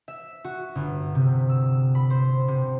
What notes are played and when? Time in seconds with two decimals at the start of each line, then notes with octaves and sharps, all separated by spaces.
0.08 E5
0.44 F#4
0.75 G1
1.15 C3
1.49 E6
1.95 B5
2.10 C5
2.48 C3